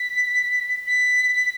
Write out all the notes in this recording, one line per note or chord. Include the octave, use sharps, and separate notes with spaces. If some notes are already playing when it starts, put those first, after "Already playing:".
Already playing: B6
B6